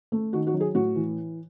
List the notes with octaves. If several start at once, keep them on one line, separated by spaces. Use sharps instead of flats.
A3
D#3 F#4
F#4
F#3
G#4
A2 F#4
E3